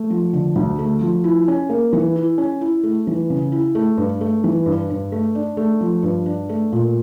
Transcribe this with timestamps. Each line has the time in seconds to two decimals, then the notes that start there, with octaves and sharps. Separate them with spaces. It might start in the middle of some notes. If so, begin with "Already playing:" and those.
Already playing: A3
0.10 F3
0.33 D3
0.56 D2
0.79 A3
1.01 F3
1.24 E4
1.48 C#4
1.69 A#3
1.93 E3
2.16 E4
2.38 C#4
2.61 E4
2.83 A3
3.07 E3
3.30 C#3
3.52 E4
3.75 A3
3.97 G2
4.21 A3
4.44 E3
4.66 G2
4.90 G2
5.12 A3
5.35 D4
5.57 A3
5.81 F3
6.03 G2
6.26 D4
6.49 A3
6.72 A#2